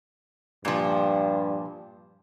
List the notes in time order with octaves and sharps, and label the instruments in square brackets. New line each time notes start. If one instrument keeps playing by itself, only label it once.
[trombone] G2 [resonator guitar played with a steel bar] A#2 F3